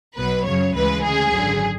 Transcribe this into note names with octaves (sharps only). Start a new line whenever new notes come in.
B1 B2 F#3 B4
F#2 C#3 F#3 C#5
D2 C#3 E3 G#3 B4
D2 C#3 G#3 G#4
G#1 F#2 D3 F#3